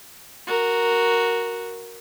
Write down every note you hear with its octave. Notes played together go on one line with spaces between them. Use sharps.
F#4 A#4